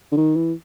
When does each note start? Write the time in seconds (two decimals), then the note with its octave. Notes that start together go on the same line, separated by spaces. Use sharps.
0.12 D3
0.17 D#3
0.35 E3